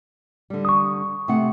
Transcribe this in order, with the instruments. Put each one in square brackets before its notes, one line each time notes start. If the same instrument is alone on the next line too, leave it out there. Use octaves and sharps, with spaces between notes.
[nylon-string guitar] D3 G3
[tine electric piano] C#6 D#6
[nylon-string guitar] C3 A3 F#5